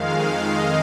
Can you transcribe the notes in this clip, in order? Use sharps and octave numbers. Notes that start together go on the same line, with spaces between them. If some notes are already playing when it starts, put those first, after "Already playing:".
Already playing: F2 D#3 G#3 F5
D#5